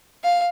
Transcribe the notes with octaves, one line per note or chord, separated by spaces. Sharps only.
F5